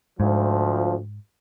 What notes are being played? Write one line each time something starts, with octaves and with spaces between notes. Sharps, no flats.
D2 G#2 F3